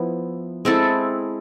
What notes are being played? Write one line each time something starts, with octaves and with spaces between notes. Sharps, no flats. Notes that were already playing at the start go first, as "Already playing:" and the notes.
Already playing: F3 B3 E4
G#3 C4 E4 A4